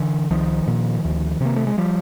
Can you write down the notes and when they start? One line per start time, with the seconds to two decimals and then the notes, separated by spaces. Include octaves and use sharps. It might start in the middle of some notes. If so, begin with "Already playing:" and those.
Already playing: D3 E3
0.30 C2 D#3 F3
0.67 A#2
1.05 D2
1.41 C3 A#3
1.56 A3
1.67 G#3
1.78 F3 G3